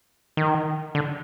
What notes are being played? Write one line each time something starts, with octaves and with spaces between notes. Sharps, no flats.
D#3
D3